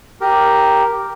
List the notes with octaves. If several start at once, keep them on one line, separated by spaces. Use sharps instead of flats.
G4 A#4